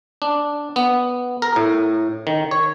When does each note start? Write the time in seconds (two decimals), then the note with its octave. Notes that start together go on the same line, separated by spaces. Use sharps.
0.22 D4
0.76 B3
1.42 A#4
1.56 A2
2.27 D#3
2.51 C#5